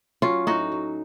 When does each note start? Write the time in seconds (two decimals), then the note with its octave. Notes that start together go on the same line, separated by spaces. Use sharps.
0.22 F#3 C#4 F4
0.47 A2 D#4 F#4
0.72 F#3